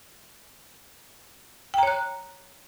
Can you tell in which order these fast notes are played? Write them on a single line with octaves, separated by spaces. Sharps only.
G5 A#5 C#5 F#6